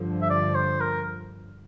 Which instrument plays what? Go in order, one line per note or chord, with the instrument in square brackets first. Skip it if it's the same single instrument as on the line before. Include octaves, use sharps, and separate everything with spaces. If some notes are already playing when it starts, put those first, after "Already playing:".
Already playing: [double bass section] G2 D3 F3
[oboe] E5
D5
C5
A#4